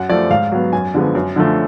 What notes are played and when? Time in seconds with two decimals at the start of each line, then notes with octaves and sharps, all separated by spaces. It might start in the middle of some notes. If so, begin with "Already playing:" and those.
Already playing: F#2 F#5
0.09 F3 A3 D5
0.30 G#2 F5
0.52 F#3 B3
0.73 F#2 G#5
0.94 D3 F3 G#3 B3
1.15 F#2
1.36 D3 F3 A3